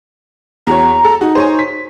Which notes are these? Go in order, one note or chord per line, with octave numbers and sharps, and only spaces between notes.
E2 F#4 C#5 A#5
A4
D#4 F#4
C5 C#5 G#5
B6